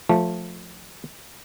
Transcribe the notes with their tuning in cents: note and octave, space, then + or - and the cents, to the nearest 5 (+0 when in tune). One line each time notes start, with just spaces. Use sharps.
F3 +15 A3 +0